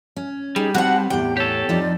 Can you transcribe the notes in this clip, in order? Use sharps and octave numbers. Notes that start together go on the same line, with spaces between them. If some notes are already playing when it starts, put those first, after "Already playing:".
C#4
G3 D#4 G#4
B3 C4 F#4 F#5 A5
E2 A2 G4 G5
G4 A4 C#5
F2 F3 D#4 D5